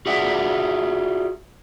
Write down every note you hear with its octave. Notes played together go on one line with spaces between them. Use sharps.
F4 F#4 G#4 D5 E5 F#5